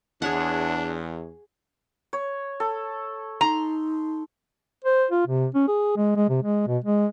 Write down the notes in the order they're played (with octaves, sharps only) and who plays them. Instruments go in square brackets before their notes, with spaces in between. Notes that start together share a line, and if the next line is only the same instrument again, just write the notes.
[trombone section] E2 [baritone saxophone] D4 [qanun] G#4 C#5 F#5
[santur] C#5
A4
[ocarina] D#4 [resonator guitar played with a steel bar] A#5 [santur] C6
[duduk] C5
F4
C3
C#4
G#4
G#3
G#3
C3
G#3
B2
G#3